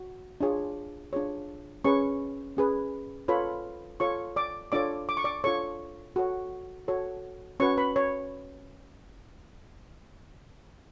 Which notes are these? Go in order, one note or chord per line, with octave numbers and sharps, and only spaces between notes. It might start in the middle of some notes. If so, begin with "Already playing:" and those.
Already playing: F#4
D4 F4 G#4 C#5
D4 F4 G#4 C#5
C#4 G#4 B4 C#5 C#6
C#4 G#4 B4
F4 A4 B4 C#5 B5
F4 A4 C#5 C#6
D5 D6
D4 F4 A4 C#5 D5 D6
D6
C#6
D5 D6
D4 F4 A4 C#5 C#6
F#4 A4 C#5
F#4 A4 C#5
C#4 F#4 B4 C#5 C#6
B4 B5
C#5